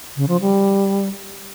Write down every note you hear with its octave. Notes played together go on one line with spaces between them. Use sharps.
C#3
F3
G3